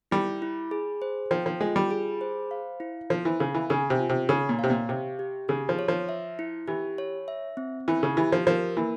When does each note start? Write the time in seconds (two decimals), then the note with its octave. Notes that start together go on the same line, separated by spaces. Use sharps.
0.11 G3 E4
0.42 E4
0.71 G#4
1.02 C5
1.31 F3 G5
1.46 F3
1.61 G#3 F4
1.76 G3
1.91 G#4
2.21 C5
2.51 F5
2.80 E4
3.10 F3 C5
3.25 E3
3.40 C#3 F5
3.55 E3
3.70 C#3 G#5
3.90 C3
3.99 F4
4.09 C3
4.29 C#3 C#5
4.49 A#2
4.59 C3 F5
4.70 A#2
4.89 C3 G4
5.19 G4
5.49 C#3 G#4
5.69 F3
5.79 C#5
5.88 F3
6.09 E5
6.39 E4
6.68 E3 G4
6.98 C#5
7.28 E5
7.57 C4
7.88 E3 E4
8.03 C#3
8.17 E3 G4
8.32 F3
8.47 F3 A#4
8.77 E3 A#3